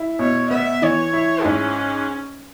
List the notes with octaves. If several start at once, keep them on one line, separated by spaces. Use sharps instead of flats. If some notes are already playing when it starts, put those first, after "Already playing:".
Already playing: E4
B2 C#5
B3 E5
E3 C#5
E4
G#2 C#4